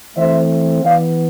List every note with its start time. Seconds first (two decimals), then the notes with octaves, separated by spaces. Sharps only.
0.16 E3 A3 C4 C5 E5
0.84 E3 B3 D5 F5